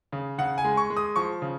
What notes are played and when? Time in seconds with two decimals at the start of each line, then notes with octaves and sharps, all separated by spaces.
0.12 C#3
0.38 C#3 F#5
0.58 G#5
0.64 G#3
0.77 C#6
0.90 G#3
0.97 D#6
1.16 F3 C#6
1.42 C#3